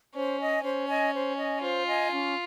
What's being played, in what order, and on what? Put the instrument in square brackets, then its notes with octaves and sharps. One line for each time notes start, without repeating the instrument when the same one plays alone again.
[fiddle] C#4 [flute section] C5
[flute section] D#5 G#5
[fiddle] C#4 [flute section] C5
[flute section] D#5 G#5
C5
D#5 G#5
[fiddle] F4 [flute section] C5
[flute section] D#5 G#5
C#4